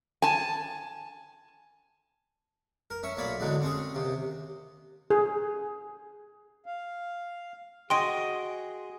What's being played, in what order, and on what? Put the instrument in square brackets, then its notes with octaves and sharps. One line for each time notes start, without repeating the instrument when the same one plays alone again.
[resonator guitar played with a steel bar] G#5 A5
[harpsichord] A#4
C#4 E5 C#6
B1 A#2 A#3 C#5 D5 B5
E2 G#2 D3 F#3 G#3
C4 C#4 G#4
D#2 C3
[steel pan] G#4
[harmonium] F5
[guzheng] F#4 D#5 G#5 [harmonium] G#4 [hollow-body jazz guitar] G5 [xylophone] C6 D7